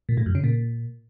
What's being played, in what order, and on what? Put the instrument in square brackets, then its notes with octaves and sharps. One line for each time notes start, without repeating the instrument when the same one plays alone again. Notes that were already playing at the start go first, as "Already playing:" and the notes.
[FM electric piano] A#2
A2
F#2
C#3
A#2